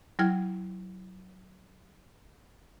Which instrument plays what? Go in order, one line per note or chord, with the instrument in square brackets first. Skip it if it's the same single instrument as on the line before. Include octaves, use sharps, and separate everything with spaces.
[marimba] F#3 E4 G5 F6 G#6